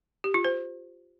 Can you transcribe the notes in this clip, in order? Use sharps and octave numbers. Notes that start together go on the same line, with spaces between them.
G4
F4
C5